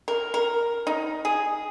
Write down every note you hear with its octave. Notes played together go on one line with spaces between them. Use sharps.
A#4
A#4
D#4
G#4